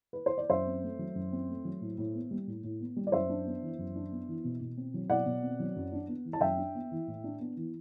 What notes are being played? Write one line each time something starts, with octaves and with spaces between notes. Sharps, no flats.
B4
C5
D5
F#2 C5 E5
C4
A3
F#3
F#2
C4
A3
F#3
A2
A2
B3
G3
A2
A2
B3
G3
D5
F#2 C5 E5
D4
B3
E3
F#2
D4
B3
E3
B2
B2
C4
F#3
B2 D5 F#5
B2
C4
F#3
F#2
D4
B3
E3
A5
F#2 E5 G5
D4
B3
E3
A2
D4
B3
E3